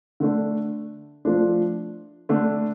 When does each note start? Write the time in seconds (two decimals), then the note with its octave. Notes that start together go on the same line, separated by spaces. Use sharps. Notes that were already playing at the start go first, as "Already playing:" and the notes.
0.20 D3 A3 D4
1.25 F3 A3 D4
2.29 D3 A3 D4